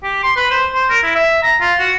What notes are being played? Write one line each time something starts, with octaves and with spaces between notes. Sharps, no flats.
G4
C6
B4
C5
C5
A#4
E4
E5
A#5
F4
F#4